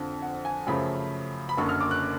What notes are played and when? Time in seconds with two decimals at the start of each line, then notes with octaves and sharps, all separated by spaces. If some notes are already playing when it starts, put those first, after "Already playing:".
Already playing: F2 D3 F3
0.22 F#5
0.45 G#5
0.67 F#2 C#3 F3 A3 B5
1.49 B5
1.57 F#1 F#2 D3 C#6
1.69 F6
1.81 D6
1.91 F#6